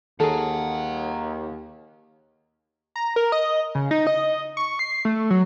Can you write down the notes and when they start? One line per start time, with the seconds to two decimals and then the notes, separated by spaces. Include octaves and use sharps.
0.20 D#2 D#3 G#4 A4 F#5 A#5
2.96 A#5
3.16 A#4
3.32 D#5
3.75 C#3
3.91 D#4
4.07 D#5
4.57 C#6
4.79 C7
5.05 A3
5.30 F#3